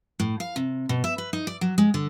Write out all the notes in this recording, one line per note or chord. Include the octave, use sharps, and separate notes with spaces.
A2
F5
C3
B2
E5
B4
D#4
D5
F#3
G#3
D3